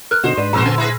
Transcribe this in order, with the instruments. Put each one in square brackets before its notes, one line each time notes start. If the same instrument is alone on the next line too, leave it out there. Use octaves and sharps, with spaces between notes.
[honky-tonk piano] A#4 [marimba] F6 F#6
[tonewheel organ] B2 D3 [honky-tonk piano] D#4 F#4 [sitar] C5
[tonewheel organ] G#2 B4 [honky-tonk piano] D4
[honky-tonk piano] F2 E6 F6 [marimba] A#2 [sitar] A#3 F#4 C5
[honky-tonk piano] D3 [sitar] B3 [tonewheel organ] G#5 A5 C6
[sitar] G#3 G#4 B4 [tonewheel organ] E4 [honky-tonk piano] B5 A#6